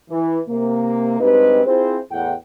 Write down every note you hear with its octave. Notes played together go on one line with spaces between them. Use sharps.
E3
C3 A#3
G2 G#3 C4 D#4 G4 B4
C4 E4 F4 G#4 C5
E2 A2 F#5 G5